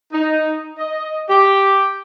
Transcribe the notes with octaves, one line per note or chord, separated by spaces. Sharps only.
D#4
D#5
G4